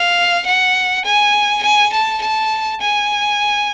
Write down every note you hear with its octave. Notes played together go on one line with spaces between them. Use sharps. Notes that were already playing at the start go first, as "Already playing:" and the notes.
Already playing: F5
F#5
G#5
G#5
A5
A5
G#5